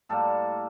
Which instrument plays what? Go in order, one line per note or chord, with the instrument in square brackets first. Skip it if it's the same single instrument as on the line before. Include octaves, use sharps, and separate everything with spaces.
[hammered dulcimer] A2 G3 A#3 A4